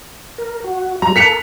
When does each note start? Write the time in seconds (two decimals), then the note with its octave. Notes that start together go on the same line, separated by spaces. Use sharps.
0.38 A#4
0.64 F#4
1.02 F#3 G3 A#5
1.16 A4 A#4 B6 C#7 F7